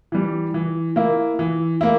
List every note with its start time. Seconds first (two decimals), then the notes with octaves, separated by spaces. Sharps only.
0.12 E3 G3
0.54 E3
0.96 A#3 E4
1.39 E3
1.81 A#3 E4